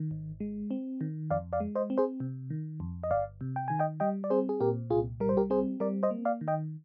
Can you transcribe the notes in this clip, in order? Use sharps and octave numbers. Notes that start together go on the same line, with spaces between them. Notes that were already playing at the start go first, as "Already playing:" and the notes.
Already playing: D#3
G#1
G#3
C4
D#3
F2 D5 F5
D5 F5
G#3
C5 D#5
C4
G#4 C5
C3
D#3
F2
D#5
G1 D5 F5
C3
G5
D#3 G#5
D#5 G5
G3 D#5 G5
D5
C4 G#4 C5
G#4
A#2 G4 A#4
C2 F4 G#4
G3 A#4
C5
G4 A#4
C4 G#4 C5
G3 A#4 D5
C5 D#5
A#3
D5 F5
D#3
D#5 G5